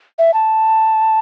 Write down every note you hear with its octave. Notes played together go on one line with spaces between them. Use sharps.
E5
A5